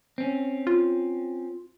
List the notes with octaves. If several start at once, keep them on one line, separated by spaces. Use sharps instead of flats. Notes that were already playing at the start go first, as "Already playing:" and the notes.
C4 C#4
F4